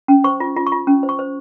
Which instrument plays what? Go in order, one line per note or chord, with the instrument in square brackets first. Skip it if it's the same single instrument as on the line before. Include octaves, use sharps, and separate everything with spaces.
[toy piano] C#4
C5 C#6
F4
F4
C#6
F4
C#4
C5
C#6
C5